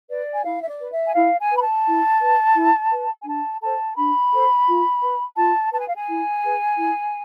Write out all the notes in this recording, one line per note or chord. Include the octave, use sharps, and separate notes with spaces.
B4 D5
G#5
E4 F5
E5
D5
B4
E5
G#5
E4 F5
G#5
B4
B5
A5
E4
B4
E4
B4
G#5
D4 A5
A4 C5 A5
D4 B5
A4 C5
F4
B4
F4 A5
B4 A5
G#5
F5
G#5
E4
G#4 B4
E4